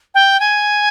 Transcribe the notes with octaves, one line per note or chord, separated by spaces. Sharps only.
G5
G#5